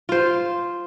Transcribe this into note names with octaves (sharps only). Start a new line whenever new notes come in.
F4 C5